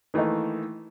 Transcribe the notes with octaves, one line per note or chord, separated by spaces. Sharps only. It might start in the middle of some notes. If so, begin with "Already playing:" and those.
D#3 E3 A3 A#3 D#4